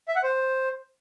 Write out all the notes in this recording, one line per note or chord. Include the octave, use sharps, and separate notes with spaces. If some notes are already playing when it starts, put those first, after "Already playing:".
E5
F#5
C5